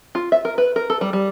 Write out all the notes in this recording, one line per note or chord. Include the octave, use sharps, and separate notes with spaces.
F4
E5
A#4
B4
A#4
A4
G3
G3